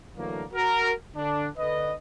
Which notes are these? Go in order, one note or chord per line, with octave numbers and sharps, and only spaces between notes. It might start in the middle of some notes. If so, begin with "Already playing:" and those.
D3 E3 F#3 A3 A#3
F#4 A#4
D3 D4
D3 B4 D#5